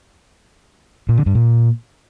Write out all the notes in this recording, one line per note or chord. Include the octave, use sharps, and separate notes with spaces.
A#2
D3
G2
A#2